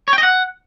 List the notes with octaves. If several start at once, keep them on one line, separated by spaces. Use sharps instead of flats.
C#5
G5
D#5
F#5